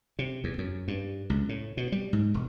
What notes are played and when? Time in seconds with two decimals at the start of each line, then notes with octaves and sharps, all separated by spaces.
0.19 C3
0.44 E2
0.58 F#2
0.88 G2
1.30 C#2
1.49 A2
1.77 B2
1.92 G3
2.13 G#2
2.34 E1